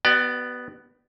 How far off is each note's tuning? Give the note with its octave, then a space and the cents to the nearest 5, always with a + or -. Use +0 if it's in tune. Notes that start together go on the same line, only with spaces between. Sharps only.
B3 +0 G4 -45 D5 +25